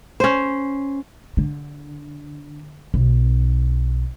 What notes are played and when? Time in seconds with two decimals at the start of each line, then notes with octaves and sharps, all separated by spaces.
0.20 C#4 C5
1.37 D3
2.94 B1